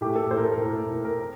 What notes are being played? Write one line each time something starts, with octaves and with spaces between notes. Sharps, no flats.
A2 A3 G4
A4
A2 A3 C5
A#4
A4
A#4
A2 A3
A2 A3 A#4
A#4
A#4